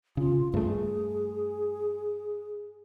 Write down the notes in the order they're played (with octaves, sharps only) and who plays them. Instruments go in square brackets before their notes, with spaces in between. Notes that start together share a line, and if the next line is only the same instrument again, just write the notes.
[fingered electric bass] C#3 [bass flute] F4
[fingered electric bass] G2 A3 [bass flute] G#4